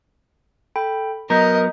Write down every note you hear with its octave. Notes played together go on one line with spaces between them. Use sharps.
A4 G5 B5
F#3 B3 A#4 D#5 A#5 G6 B6